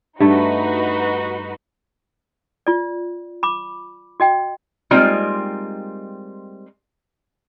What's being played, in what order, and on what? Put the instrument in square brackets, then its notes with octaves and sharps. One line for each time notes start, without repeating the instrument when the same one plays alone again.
[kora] G2 A3 [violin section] D#4 F#4 B4
[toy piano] F4 D5
B5 D6
F#4 D#5 G5
[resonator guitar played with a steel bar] G3 G#3 A#3 C4 D#4 F4